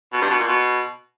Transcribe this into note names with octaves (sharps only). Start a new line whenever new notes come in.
B2
G2
B2
A#2
B2